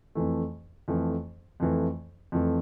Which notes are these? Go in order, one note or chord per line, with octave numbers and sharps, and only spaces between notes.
F2 E3 A3
F2 E3 A3
F2 E3 A3
F2 E3 A3